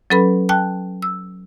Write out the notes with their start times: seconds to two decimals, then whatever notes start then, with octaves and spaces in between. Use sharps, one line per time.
0.10 F#3 C#4 A4 B4 B5
0.49 G5 A5 F#6
1.02 E6